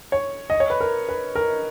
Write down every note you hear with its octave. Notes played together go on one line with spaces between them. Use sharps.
C#5
D#5
C#5
B4
A#4
B4
A#4